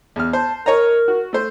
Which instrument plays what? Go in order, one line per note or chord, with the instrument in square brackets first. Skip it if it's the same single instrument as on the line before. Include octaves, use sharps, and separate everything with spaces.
[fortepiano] E2 F6
[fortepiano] C5 [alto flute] A5
[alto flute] A#4 [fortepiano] C#5 D#5 A#5
[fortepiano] F#4
A3 C5